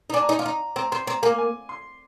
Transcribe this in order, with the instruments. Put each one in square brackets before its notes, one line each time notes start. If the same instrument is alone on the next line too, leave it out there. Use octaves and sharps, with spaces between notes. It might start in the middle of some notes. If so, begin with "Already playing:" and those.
[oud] D#4
[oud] D4 [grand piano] G#5
[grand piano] A#5
[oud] D#4 [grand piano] G#5
[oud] F4
[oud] D#4 [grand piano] A#5
[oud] C4 [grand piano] A#5
[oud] C4 [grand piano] C6
[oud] C4 [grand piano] A#5
[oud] A#3 [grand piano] G#5
[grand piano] G#5
C6